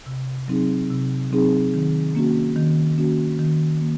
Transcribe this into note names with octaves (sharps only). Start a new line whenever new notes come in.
C3
F#3 C4 D#4 G#4
C3
F#3 C4 D#4 G#4
D#3
A#3 C#4 F#4
D#3
A#3 C#4 F#4
D#3
A#3